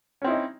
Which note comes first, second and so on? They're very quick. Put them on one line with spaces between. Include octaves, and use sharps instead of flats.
C#4 C4 E4 D#4